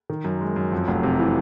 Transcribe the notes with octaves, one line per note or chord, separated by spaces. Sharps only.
D#3
F#2
G#3
F#2
F2
F1
C3
E3